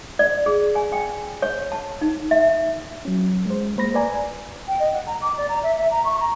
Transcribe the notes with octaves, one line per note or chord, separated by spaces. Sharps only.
D5
G#4
G#5
G5
C#5
A5
D#4
E5
F#3 C#4
G#3 C5
G#3 A#3 C5 B5 A#6
B4 D5 G#5 A#5
G5
D#5
F#5
A#5
D6
D5
A#5
E5
E5
A#5
C#6
A#5